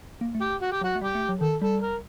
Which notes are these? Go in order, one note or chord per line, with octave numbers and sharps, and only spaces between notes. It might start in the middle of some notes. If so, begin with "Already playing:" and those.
A#3
A3
G4
F#4
G4
F#3 F#4
A3
G3 G4
A3
F#3
D#3 A4
G3 A4
A#4